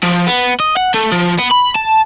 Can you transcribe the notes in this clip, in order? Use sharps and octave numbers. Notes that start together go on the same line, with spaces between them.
F3
B3
D#5
F#5
A3
F3
B3
B5
A5